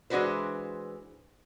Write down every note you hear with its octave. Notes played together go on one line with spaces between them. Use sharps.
E3 G#3 D4 F#4 B4 C5